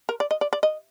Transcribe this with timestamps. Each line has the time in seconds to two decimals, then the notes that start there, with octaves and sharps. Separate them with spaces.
0.09 A#4
0.20 D5
0.31 D#5
0.41 D5
0.53 D5
0.63 D#5